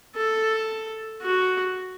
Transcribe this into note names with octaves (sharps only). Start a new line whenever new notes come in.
A4
F#4